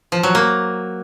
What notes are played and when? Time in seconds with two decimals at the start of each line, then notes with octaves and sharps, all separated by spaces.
0.12 F3
0.23 F#3
0.35 A#3